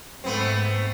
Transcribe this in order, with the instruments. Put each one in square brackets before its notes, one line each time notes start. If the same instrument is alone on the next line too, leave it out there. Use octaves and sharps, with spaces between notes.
[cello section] G#2 [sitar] A3 B3 C4